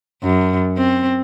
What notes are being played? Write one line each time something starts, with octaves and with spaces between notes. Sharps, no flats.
F#2
C4